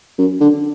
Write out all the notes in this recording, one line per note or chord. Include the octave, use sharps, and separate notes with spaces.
F#2
D3